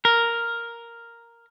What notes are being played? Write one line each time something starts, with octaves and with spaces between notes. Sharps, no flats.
A#4